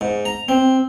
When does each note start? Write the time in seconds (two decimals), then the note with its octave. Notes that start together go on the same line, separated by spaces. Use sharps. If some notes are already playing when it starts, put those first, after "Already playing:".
0.01 G#2
0.25 A#5
0.48 C4